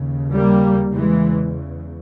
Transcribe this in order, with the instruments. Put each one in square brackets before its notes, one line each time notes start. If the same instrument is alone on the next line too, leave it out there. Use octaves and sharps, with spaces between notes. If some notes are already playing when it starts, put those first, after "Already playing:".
Already playing: [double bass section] D#2 C#3
G3 A#3
E2 C#3 E3 G#3